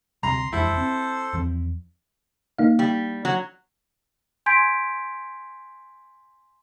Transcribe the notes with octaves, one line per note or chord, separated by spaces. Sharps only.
D2 C3 G3 A#5 C6
E1 F2 G#3 E4 A4 C5
C4
E2 F3 C4
A#3 D#4 F5
G3
F#3
G#5 C6 G6 G#6 B6 D7